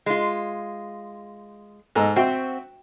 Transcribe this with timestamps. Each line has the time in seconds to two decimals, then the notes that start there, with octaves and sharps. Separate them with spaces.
0.06 G#3 F4
1.95 G#2 A4 A#5
2.16 C4 F#4 E5 G5